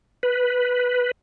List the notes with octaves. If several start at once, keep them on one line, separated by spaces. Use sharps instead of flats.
B4